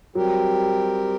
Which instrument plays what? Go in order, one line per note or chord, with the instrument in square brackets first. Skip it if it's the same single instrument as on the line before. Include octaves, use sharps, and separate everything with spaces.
[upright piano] F#3 [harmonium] G3 C4 G4 A#4